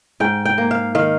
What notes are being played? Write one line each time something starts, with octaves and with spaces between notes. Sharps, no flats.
G#2 G5
G5
A#3
F5
D#3 F5